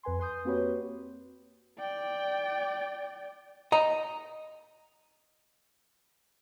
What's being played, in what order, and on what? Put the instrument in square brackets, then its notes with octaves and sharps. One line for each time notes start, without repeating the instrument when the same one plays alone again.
[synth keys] F2 B4 G#5 C6
B4 C6 D#6 G6
A#3 C4 F#4 G4 B4 C#5
[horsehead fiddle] D5 G5
[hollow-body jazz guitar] D#5 A#5